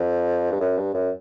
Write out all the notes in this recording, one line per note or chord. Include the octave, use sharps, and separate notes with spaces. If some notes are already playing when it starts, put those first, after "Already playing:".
Already playing: F2
G2
F#2
G2
F#2